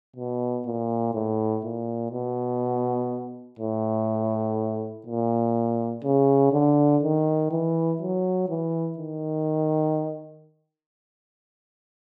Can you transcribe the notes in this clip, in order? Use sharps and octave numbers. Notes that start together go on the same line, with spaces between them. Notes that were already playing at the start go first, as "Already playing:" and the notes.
B2
A#2
A2
A#2
B2
A2
A#2
C#3
D3
D#3
E3
F#3
E3
D#3